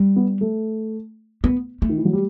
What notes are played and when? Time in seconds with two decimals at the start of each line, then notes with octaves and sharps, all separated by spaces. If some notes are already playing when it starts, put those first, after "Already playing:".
Already playing: G3
0.16 B3
0.41 A3
1.44 B3
1.82 A3
1.89 D#3
1.98 E3
2.05 F#3
2.13 G3